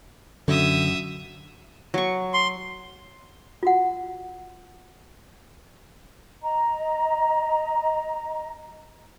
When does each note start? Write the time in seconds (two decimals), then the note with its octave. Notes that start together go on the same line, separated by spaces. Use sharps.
0.48 F#2 D3 E5 D#6
1.94 F#3 C#6
2.34 C6
3.63 F4 F#4 F#5
6.42 D#5 A#5